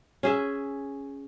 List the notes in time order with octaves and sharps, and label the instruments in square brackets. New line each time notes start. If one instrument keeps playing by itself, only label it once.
[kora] C#4 G#4 E5